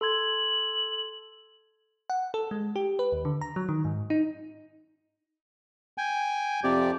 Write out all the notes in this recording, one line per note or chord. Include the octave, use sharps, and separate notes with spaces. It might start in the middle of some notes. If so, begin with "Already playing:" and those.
A4 C6 G#6 F#7
F#5
A4
G#3
G4
B4
D#2
D3
A#5
F#3
D#3
G#2
D#4
G5 G#5
F2 C3 G4 D5